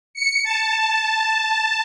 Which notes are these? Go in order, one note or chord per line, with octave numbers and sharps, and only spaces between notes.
C#7
A5